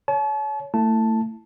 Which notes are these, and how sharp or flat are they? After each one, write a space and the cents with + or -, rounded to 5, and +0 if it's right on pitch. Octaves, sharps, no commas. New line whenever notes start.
C#5 +20 A5 -40
A3 +25 E4 +0 A5 +0